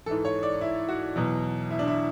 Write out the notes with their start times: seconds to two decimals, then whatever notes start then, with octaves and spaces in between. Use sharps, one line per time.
0.06 G#2 E3 A4
0.25 C#5
0.43 D5
0.61 E4
0.89 F#4
1.16 E2 B2 F#3
1.70 E4
1.79 D4
1.88 E4